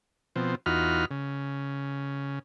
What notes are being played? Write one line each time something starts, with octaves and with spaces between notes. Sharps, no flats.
B2 F3 C4
E2 D#4 F4 F#4 B5 F6
C#3